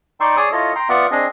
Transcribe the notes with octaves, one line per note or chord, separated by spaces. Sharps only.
D#4 D5 G5 C6 C#6 E6
G#4 C#5 D5 D#6 E6
E4 F4 A4 C#5 D#5
G5 A#5 C6
B3 F4 D5 E5 F#5
C4 D4 G#4 D#5